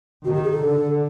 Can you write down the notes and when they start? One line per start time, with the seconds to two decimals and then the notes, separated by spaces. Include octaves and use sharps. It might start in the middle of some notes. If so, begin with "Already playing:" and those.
0.25 D#3 F#4
0.34 G4
0.43 G#4
0.53 A4
0.63 D3